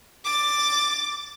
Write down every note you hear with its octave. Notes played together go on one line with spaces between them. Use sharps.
D6 A6